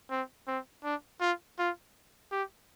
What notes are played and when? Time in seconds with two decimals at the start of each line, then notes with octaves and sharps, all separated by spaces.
0.11 C4
0.47 C4
0.84 D4
1.21 F4
1.59 F4
2.32 G4